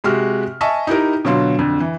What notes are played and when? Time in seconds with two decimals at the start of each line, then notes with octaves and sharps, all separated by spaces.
0.04 C3 G#3 F#4 G4 F6
0.61 D#5 E5 G#5 A5 C#6
0.87 D#4 E4 G4 A#4
1.25 B2 D3 F#3 F4 C6
1.59 F2 D3
1.80 E3